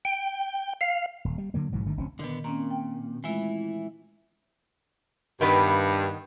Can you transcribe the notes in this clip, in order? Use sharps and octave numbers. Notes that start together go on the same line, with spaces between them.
G5
F5
D#1
G3
D3 F#3 A#3
B1 G#2 E3 F#3
G1 D3 D#3 A3
F1 D2 C4 C#4
A#2 D3 D#3 B3
A#2 C4 C#4 A#5
G5
E3 G#3 A3 E4 F4
G2 D#3 B3